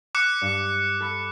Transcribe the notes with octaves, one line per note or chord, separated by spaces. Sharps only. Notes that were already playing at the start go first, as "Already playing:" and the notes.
D6 F#6 C#7
G2
A4 B5